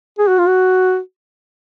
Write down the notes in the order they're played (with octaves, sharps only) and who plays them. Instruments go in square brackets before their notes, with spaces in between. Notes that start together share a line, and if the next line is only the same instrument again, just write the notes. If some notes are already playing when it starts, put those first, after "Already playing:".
[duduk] G#4
F#4
F4
F#4